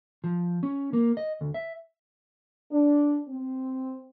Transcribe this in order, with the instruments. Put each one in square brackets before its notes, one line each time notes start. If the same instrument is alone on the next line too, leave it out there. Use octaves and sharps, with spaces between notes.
[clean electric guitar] F3
C#4
A#3
D#5
D2
E5
[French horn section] D4
C4